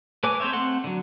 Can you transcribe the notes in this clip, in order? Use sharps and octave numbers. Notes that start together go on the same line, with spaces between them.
A3 B4 C#5 G#5 D6
A3 C4 C5 C#5 E5
A3 C4 F#5 C6
D3 F#3